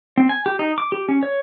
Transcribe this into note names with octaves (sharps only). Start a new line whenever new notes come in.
C4
G#5
G4
D#4
D6
G4
C#4
C#5